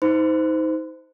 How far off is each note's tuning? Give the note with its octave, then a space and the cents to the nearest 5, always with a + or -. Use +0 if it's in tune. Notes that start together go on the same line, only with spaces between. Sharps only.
D#4 +30 C5 -25 B5 +40